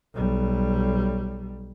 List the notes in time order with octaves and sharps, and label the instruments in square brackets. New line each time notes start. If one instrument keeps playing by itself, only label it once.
[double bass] B1 G3